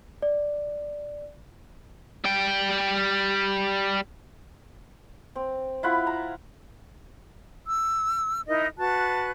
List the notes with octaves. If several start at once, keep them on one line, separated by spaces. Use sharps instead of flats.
D5
G3 G5
C4
E4 F4 F#5 B5
A#5
E6
D#4 E4 A#4 D#5
F#4 B4 A5 F#6